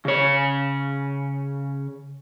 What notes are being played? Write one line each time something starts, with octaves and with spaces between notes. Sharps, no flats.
C#3 C#5